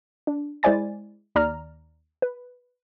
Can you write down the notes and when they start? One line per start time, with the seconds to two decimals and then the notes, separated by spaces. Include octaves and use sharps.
0.27 D4
0.63 G#3 E4 C5 D5 G#5 A6
1.35 D#2 D5 A#5 F6
2.22 B4